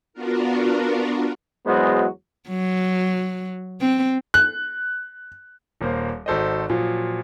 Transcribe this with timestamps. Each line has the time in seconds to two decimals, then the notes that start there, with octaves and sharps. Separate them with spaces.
0.13 B3 D4 F4 F#4 A#4
1.67 E2 F#3 G#3 B3 F#4 C5
2.49 F#3
3.81 C4
4.34 F#6
5.81 D#1 A#3 C5
6.26 G#1 F#4 A4 C5 D5 D#5
6.70 A#2 F3 F#3